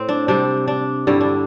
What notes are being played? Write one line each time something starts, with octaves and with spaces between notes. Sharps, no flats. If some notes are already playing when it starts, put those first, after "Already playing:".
Already playing: A2 C4
D4
C3 G3 D4
D4
G2 D3 G3 E4
D4